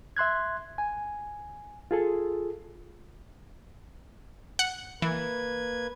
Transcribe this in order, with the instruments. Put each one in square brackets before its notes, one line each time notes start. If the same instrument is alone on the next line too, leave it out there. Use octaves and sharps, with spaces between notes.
[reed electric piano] E5 C6 F#6 G#6
G#5
F4 G#4 A4
[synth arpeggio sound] F#5
[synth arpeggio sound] E3 [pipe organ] A#3 B4 G#6